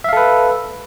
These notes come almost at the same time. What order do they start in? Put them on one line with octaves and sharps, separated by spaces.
E5 F5 A4 B4